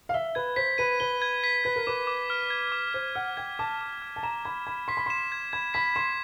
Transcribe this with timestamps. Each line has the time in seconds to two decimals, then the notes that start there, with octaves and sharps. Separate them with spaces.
0.09 F5
0.14 E5 G7
0.35 B4 G#6
0.56 C5 B6
0.78 B4 D#7
1.00 B4 G7
1.22 G#6
1.44 B6
1.64 B4 G#6
1.76 A#4
1.87 B4 D6
2.07 D6
2.30 F6
2.50 G#6
2.72 D6
2.94 C5 D6
3.15 F#5 F6
3.37 G5 G#6
3.59 A5 D6
3.81 D6
4.02 F6
4.16 A5
4.23 A#5 E7
4.45 B5 G#6
4.66 B5 G#6
4.88 C6 B6
4.97 B5
5.06 C6 E7
5.32 G#6
5.53 B5 G#6
5.74 B5 B6
5.95 C6 E7